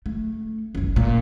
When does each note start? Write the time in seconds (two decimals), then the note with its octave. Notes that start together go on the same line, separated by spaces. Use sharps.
0.06 A3
0.75 F#1 C2
0.96 A#2